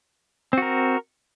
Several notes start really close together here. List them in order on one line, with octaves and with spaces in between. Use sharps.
C4 F#4 A#4